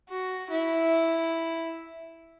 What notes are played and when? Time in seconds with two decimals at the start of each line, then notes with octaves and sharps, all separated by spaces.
0.10 F#4
0.51 E4